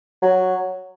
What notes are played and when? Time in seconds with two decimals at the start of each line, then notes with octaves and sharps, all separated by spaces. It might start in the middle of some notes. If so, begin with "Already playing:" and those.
0.22 F#3